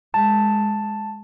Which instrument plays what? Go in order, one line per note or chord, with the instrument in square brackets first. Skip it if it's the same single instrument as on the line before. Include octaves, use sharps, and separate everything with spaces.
[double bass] G#3 [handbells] A5